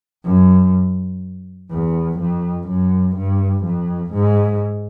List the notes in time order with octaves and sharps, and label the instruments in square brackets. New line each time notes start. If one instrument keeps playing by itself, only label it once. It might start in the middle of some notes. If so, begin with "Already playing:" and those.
[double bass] F#2
E2
F2
F#2
G2
F2
G#2